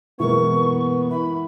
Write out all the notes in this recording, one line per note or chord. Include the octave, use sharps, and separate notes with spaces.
F#2 B2 E3 G#3 A#3 B3 C#6
E4 B5